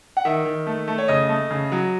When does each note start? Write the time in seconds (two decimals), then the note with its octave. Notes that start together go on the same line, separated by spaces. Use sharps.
0.17 F#5
0.25 D#3 E5
0.45 D#3
0.67 A3
0.88 A3
0.98 C#5
1.08 C#3 D#5
1.29 A3
1.50 C#3
1.72 F#3